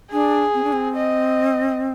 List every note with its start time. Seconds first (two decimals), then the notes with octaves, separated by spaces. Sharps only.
0.12 D4 G#4
0.54 C4
0.64 D4
0.73 C4
0.97 D#5